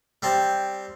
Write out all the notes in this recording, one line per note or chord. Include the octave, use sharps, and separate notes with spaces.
G3 C4 A5